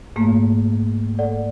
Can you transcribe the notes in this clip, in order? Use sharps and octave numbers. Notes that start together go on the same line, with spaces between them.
G#2 A3 A#3
A4 D5 F#5